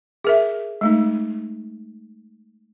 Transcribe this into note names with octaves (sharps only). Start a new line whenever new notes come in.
G#4 A#4 E5
G#3 A3 D#4